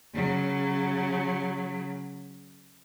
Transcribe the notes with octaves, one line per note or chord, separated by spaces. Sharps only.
C#3 F#3